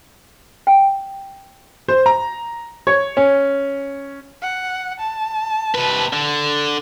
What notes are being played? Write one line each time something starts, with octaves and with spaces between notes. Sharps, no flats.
G5
C5
A#5
C#5
C#4
F#5
A5
C3 B4
D3